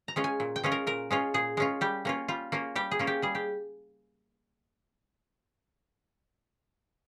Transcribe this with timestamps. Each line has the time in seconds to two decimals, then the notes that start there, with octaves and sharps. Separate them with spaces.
0.08 A#5
0.16 G#3 C#4 F4
0.24 G#5
0.40 A#2
0.56 G5
0.64 G#3 C#4 F4
0.72 A#4
0.87 A#2 A#4
1.11 G#3 C#4 F4
1.34 A#2 G#4
1.57 G#3 C#4 F4
1.81 G3 G4
2.05 A#3 C#4 F4
2.28 G3 F4
2.52 A#3 C#4 F4
2.76 G3 G4
2.91 G#4
2.99 A#3 C#4 F4
3.07 G4
3.22 G3 G#4
3.35 G4